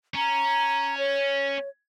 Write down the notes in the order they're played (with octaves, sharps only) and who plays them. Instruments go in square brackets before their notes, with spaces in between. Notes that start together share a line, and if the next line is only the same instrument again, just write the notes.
[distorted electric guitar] C#4 [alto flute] A#5
[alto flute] C#5